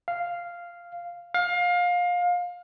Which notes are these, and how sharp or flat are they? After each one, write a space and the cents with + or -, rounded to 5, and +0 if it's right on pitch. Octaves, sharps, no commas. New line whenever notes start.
F5 -5
F5 +25